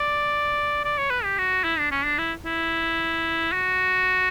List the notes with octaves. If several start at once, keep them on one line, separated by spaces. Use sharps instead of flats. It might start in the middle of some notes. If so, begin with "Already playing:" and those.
Already playing: D5
D5
C#5
B4
G4
F#4
E4
D4
C#4
D4
E4
E4
F#4